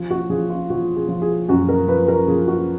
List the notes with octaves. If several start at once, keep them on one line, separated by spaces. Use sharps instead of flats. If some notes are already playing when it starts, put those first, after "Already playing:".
Already playing: F3
F#4
F3 G#4
F4
F3 F#4
G#4
F3
G#4
F#2 F#4
A#4
F3 B4
A#4
F3 G#4
F#4